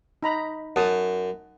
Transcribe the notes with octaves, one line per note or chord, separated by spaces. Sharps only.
D#4 A#5 B5
F#2 F#5 A5 D#6